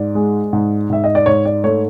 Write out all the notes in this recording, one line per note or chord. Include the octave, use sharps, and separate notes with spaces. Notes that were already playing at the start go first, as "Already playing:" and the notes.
Already playing: G#2 D5
G#3
G#2
G#2 E5
D#5
D5
G#2 C#5
D5
A3 C#5